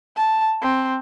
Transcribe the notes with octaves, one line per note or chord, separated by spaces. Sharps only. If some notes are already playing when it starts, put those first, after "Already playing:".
A5
C4